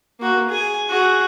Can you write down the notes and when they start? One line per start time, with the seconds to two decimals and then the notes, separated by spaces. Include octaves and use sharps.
0.20 A#3 F#4
0.49 G#4 G#5
0.89 F#4 G#4